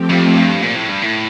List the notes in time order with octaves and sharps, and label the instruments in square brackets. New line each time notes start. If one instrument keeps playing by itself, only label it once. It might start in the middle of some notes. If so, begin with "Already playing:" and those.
Already playing: [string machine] F3 A3 C4 G4
[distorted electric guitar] F2
G2
A#2
A2
G2
A2